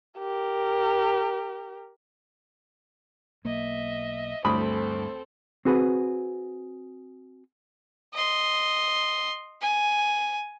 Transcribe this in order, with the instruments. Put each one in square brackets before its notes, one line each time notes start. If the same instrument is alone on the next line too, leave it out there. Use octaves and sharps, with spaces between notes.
[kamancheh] G4 A#4
[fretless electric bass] B1 A#3 [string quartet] D#5 E5
[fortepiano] D2 B5 D#6 [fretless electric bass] G2 [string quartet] C4 A4
[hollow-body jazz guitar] C4 F#4 G#4 B4
[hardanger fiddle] D#5 C6
G#5